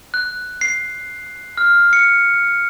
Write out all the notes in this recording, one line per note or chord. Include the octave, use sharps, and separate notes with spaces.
F#6
C7
F6
C#7